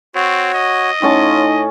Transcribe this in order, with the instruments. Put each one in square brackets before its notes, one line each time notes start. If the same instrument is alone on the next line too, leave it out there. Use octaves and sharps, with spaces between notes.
[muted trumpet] C4 [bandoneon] F#4 C#5
[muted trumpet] D#5
[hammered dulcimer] A2 C#4 A5 [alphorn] D#4 [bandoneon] F4